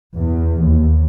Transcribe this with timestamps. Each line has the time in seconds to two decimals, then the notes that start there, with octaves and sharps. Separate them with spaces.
0.16 E2
0.61 D#2